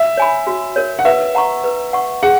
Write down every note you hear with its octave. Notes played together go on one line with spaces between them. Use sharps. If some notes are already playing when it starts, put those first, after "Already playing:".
Already playing: E5
C#5 G#5 B5
F#4
A#4 C#5
F#5
B4 E5
F#5 A#5 C#6
B4
F#5 C#6
G#4 F#5